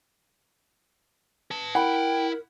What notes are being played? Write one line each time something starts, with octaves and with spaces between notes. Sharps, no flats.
B4 A5
E4 A#4 F#5 G5 B5